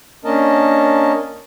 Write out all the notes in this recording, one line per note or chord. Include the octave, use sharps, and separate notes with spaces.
A#3 C#4 D4 A#4 D#5 A5